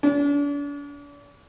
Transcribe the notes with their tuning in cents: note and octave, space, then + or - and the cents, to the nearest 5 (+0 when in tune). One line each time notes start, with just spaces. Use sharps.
D4 -40